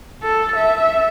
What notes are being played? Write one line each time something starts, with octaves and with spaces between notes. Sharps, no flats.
A4
E5